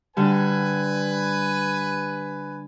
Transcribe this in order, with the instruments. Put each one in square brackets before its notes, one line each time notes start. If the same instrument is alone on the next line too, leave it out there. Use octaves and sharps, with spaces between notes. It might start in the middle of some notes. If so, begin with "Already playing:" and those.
[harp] D3 G3 [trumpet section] B4 G#5